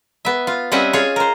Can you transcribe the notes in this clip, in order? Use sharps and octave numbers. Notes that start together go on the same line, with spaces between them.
B3 E5
F4
G3 C4 C#4 D#5 E5 F#5
F4 G#4 C#5
A#4 C5